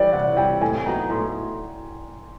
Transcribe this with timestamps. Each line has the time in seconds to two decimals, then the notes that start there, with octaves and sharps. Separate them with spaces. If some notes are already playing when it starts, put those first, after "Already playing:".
Already playing: E3 G3 C#5 D5
0.13 C3 F#5
0.37 E3 G3 G5
0.61 A2 G#5
0.86 F#3 B3 D#4 A#5
1.10 A2 C6